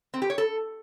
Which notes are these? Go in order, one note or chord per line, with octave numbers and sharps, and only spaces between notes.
C4
G4
C#5
A4